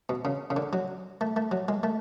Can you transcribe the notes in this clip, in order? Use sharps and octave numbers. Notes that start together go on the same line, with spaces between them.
B2
C#3
C#3
D3
F#3
A3
A3
F#3
G#3
A3